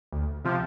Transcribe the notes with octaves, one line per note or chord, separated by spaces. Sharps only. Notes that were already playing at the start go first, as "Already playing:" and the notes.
D2
C3 F3